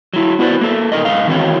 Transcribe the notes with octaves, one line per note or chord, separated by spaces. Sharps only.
F#3 E4
B3 F#4 B4 C5 D5
A#3 A4
A#2 D#4 A#4 D#5
G#2 D#5 F5
D#3 E3 C4 F#4 C#5 G5